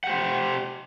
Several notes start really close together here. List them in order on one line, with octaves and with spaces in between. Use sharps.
F#5 G4 C5